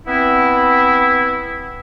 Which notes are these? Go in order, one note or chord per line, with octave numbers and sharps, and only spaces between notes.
B3 C4 E4